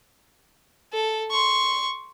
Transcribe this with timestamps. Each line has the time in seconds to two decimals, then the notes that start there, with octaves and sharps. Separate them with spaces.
0.93 A4
1.31 C6 C#6